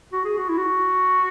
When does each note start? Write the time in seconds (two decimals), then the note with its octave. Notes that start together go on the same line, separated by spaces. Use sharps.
0.13 F#4
0.25 G#4
0.37 F#4
0.49 E4
0.58 F#4